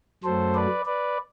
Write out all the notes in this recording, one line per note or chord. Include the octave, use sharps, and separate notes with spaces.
F#2 F#3 A3 A4 C5
B4 D5
B4 D5